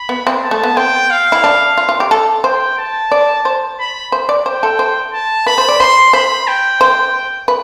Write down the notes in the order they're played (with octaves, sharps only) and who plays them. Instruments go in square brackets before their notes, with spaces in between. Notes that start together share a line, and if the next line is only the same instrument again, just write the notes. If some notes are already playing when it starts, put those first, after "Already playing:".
Already playing: [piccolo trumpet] B5
[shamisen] B3
C4
[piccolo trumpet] A5
[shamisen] A3
B3
[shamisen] C4 [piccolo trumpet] G5
[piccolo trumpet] F5
[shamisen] E4
D4
F4
F4
G4
A4
[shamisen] C5 [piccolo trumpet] G5
[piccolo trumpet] A5
[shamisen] D5
C5
[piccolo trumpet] B5
[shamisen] C5
D5
[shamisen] C5 [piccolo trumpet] G5
[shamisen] A4
C5
[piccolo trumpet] A5
[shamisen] B4 [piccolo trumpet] B5
[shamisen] C5
D5
[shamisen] C5 [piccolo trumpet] C6
[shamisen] C5 [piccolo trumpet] B5
[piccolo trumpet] G5
[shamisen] C5
B4